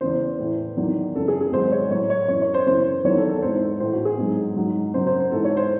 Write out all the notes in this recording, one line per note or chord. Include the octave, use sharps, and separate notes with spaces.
E2 C#3 E3 C5
A2 E3
E2 D#3 F#3
F#2 C#3 E3 A4
G#4
G#4
G#2 D#3 F#3 C5
C#5
A2 F#3 C#5
C#5
F#2 E3 C#5
C#5
C5
F#2 C#3 E3 C5
E2 D#3 F#3 C#5
A4
A4
G#2 E3 C5
A2 E3 C5
F#4
G#4
G#2 F#3
G#2 F#3
F#2 C#3 F#3 C5
C5
C5
G#2 E3 A4
C#5
C5